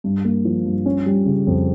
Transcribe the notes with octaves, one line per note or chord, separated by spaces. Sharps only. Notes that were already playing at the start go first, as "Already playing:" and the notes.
G2
A#3
F3
G2
C#4
G3
C#3
F2